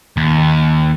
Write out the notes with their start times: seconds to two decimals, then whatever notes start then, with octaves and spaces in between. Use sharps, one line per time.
0.17 D#2